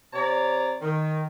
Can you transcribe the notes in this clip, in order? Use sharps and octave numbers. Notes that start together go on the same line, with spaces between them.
C3 C#5 D5 A#5
D#3